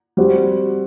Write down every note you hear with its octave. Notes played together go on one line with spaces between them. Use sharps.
G3 C4 F#4